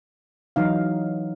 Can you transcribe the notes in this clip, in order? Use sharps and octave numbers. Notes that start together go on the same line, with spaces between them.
E3 F#3 D#4 F5